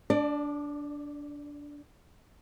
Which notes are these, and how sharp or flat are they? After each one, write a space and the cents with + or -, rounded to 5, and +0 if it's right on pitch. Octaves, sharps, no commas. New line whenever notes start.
D4 -15 D5 +25